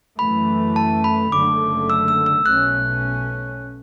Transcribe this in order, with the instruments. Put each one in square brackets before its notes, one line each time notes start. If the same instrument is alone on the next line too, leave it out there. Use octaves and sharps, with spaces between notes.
[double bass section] F#2 E3 A3 [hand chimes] B5
[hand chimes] A5
B5
[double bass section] F#1 F#2 D3 A3 [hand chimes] D6
[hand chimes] E6
E6
E6
[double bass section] B1 B2 A3 C#4 [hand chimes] F#6